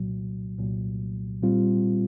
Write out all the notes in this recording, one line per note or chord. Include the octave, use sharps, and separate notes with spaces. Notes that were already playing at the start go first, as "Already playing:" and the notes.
Already playing: C2 A#2 F#3
C2 A#2 F#3
A#2 G3 C4 F4